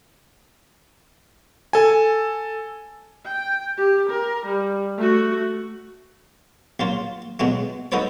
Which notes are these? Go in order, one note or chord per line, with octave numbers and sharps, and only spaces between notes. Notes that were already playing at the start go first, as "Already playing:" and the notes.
A4 G#5
G5
G4
A#4
G3
A3 F#4
A#1 F#3 F4
B2 F#3 G#3 A3
D#4 F#4 A4 B4 C#5